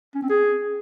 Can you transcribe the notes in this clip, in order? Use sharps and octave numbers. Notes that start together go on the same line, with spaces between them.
C#4
C4
G#4